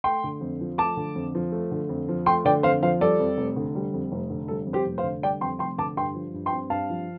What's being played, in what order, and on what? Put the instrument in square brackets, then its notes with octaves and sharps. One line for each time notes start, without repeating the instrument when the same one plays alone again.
[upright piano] A3 G5 C6
D3
F2
F3
A3 A5 D6
D3
F2
F3
A3
D3
F2
F3
A3 G5 C6
D3 D5 G5
F2 C5 F5
F3 C5 F5
G3 A4 D5
F2
F1
D3
G3
F2
F1
D3
G3 A4
F2
G4 C5
F1
C5 F5
D3
G3 D5 G5
F2 G5 C6
F1 G5 C6
D3 A5 D6
G2 G5 C6
F3
G2
G5 C6
C4
G2 F5 A5
F3